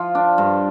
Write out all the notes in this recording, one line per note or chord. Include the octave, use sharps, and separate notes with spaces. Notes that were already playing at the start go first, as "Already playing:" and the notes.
Already playing: F3 F4
D4
G2